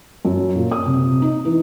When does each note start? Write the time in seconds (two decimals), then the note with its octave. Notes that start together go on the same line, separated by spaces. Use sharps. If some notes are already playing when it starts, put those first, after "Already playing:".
0.25 F#2
0.56 A#2
0.71 D#6
0.86 C3
1.22 D#4
1.45 E3